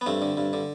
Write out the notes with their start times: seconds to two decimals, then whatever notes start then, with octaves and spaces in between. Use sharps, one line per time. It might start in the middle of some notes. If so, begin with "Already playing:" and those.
0.01 B3
0.06 G2 A3 C4
0.22 D3
0.37 G2
0.53 D3